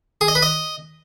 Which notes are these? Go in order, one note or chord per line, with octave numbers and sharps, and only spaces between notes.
G#4
D#5
B4
D#5